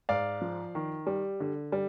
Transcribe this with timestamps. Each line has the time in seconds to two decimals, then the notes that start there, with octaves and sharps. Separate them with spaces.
0.09 G#2 D5 F5
0.42 F3
0.75 D#3
1.07 G3
1.40 D3
1.72 G3